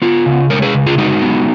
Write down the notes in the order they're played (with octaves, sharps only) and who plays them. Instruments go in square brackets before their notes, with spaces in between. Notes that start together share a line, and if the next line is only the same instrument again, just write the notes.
[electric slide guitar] B3 F4
C#3
G#3 A#4 C#5
G#4 B4
C#3
F4 G#4
G#3 D#4 F#4
B3